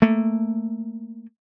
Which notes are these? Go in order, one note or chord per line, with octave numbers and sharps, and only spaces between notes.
A3 A#3